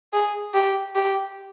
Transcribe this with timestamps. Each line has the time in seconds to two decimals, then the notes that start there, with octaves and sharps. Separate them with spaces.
0.13 G#4
0.54 G4
0.95 G4